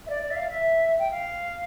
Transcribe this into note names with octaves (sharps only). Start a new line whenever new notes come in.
E5
D5
D5
E5
F5
E5
G5
F5